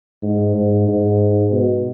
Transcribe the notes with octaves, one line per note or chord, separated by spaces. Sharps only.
G#2
G#2
G#2
B2